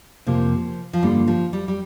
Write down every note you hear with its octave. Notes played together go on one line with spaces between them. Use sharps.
F2 C3 F3 A#3 G4
F3
G2 D3 G3 A#3 F4
F3
G3
G3